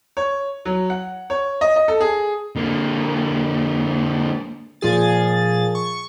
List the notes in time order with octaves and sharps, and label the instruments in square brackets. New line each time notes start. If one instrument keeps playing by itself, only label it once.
[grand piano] C#5
F#3
F#5
C#5
D#5
D#5
A4
G#4
[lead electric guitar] D3 A#3
[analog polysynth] A#2 F3 G#4 A6
C#6